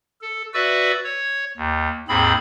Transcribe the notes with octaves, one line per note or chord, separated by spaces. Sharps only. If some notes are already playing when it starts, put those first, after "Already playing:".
A4
F#4 B4 D5 E5 E6
C#5
D#2
D#2 G#2 C4 G#4 B5